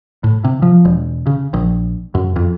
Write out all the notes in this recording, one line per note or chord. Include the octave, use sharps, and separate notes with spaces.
A2
C3
F3
E1
C#3
A#1
F#2
F2